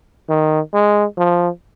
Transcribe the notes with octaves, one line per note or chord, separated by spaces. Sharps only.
D#3
G#3
F3